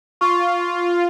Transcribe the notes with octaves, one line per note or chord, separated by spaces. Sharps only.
F4 C#6